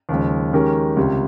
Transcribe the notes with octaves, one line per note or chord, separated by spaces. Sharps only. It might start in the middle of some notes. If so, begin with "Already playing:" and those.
D#2 C#3 F3 G#3
D#3 G#3 C#4 G4 A#4
C#2 C3 G3